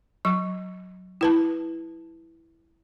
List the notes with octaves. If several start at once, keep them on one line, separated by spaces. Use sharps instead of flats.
F#3 C#6
E4 B4 A5